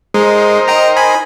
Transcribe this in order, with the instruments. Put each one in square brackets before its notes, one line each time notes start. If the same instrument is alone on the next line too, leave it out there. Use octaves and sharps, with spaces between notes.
[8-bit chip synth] G#3 [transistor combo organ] D#4 A#4 C5
[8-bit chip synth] D#5 G5 A#5
G#5 B5